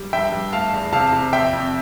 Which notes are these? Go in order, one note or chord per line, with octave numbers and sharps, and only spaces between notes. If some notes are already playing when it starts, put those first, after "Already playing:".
Already playing: G3
G2 E5 G5
G2
A3 F5 A5
E2
C3 F5 A5
C3
F2 E5 G5
F2